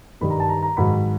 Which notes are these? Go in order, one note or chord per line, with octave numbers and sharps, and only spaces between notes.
G2 D#3 G3 B5
A#5
A5
A#5
A#5
G#2 D#3 F#3 B5